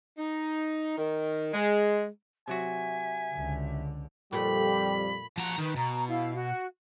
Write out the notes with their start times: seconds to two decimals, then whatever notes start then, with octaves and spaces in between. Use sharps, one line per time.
0.18 D#4
0.98 D#3
1.54 G#3
2.48 C3 F#3 F#4 E5 G#5
3.33 C#2 D3
4.33 F2 A#2 F3 G3 A3 G4 B5
5.38 F3 F#4 F#5 A#5
5.58 D#3 B4
5.76 B2 A#5
6.07 E4 F5
6.34 F#4